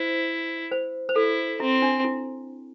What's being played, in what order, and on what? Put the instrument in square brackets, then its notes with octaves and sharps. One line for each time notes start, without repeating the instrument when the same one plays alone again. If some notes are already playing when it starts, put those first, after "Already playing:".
Already playing: [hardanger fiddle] E4 [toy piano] C5
[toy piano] C5
C5
[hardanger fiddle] E4 [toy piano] A4
[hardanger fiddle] C4 [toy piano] E4
[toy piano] D4
E4